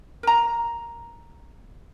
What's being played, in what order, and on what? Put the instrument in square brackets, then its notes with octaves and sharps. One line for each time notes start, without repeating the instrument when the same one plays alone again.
[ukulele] A#4 A#5